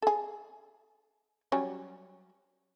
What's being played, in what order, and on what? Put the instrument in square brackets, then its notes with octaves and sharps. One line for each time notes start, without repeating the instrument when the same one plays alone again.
[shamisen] G#4 A4
F#3 G3 C#4